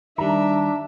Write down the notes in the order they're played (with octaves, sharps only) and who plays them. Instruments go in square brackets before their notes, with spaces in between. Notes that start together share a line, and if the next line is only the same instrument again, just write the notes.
[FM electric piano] D#3 G3 [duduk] D4 [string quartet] E5 [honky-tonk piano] A#5